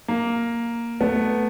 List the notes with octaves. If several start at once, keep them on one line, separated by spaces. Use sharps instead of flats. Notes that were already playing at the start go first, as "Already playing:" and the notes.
A#3
A3 B3